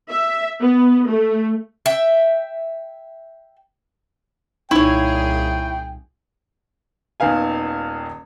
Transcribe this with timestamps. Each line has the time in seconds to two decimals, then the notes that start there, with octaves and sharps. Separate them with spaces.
0.10 E5
0.61 B3
1.07 A3
1.86 E5 G5
4.71 C2 A#2 D#4 E4 G#4 C#5 G5
7.20 D#1 D#3 B3 F5 G#5